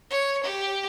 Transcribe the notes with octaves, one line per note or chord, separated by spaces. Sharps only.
C#5
G4